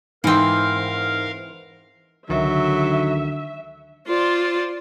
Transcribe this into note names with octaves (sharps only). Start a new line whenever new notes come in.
G#2 E3 C4 A#4 F5 F6
C#2 D3 D#3 F#3 E5
F4 C5 D5